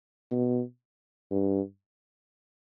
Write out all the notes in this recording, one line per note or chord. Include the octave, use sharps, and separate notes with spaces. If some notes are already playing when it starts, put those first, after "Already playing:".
B2
G2